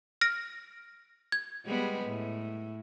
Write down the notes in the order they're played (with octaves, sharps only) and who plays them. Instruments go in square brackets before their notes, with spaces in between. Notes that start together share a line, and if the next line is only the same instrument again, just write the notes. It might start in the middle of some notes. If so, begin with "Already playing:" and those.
[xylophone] F6 A#6 D7
G#6
[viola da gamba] G3 G#3 B3
A2